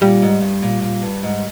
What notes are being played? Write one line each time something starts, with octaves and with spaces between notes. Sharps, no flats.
A#2 G3
G#2
G2
A#2
A#2
G2
G#2